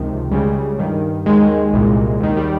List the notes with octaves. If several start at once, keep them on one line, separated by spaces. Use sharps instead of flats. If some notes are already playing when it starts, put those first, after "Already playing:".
Already playing: C#2 C3 D#3 F3
C#2 C#3 G3
G2 D#3
D#2 D#3 G#3
C2 A#2
D#2 D#3
G3